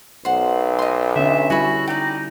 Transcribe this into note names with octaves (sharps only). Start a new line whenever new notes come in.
B1 C5 F#5
D#5 C6
D3 C#4 E5
G3 E4 F#4 G#5 B5
D#4 D5 G5